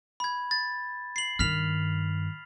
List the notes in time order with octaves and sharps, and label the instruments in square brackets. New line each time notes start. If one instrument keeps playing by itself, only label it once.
[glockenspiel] B5 G#6
A6
C7 F#7
[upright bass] G2 D#3 [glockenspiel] F6 B6 F7